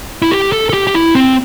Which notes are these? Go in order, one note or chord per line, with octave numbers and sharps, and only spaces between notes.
E4
G4
A4
A4
G4
G4
E4
C4